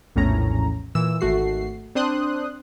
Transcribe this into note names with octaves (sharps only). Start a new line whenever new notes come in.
A#1 E2 A2 C#4 A#5
A#2 E3 E6
G#1 A3 F#4 C7
C4 D4 C5 C6 D#6 F#6